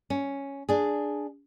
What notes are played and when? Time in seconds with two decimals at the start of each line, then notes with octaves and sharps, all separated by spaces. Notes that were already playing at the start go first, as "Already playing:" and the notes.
0.10 C#4
0.69 D4 G#4